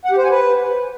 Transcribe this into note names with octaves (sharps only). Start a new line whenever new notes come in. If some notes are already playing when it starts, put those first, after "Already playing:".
F#5
G4
C5
G#5
B4